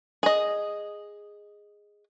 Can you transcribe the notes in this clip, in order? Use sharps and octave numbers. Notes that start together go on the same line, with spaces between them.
G#4 D#5